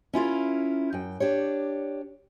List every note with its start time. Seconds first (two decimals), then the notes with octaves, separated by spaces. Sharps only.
0.13 C#4 E4 F4 A#4
0.93 F#2 G5
1.20 D4 G4 C#5